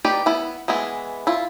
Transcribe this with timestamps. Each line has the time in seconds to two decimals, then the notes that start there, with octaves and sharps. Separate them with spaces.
0.05 D#4 G4 B4 D5
0.26 B3 E4
0.68 E3 G#3 B3 E4
1.27 E4 F4